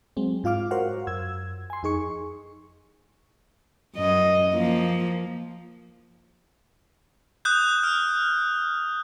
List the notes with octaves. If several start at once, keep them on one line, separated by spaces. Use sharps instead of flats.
F#3 G#3 C4
G#2 F4 F5 D6 F6
F#4 A#4 C5 C#5 F5 F#5
F#2 E6 G#6
G#5 C6
F2 D#4 G#4 C#6 C#7
F#2 D#5
F3 A#3
D#6 F#6 G6
F6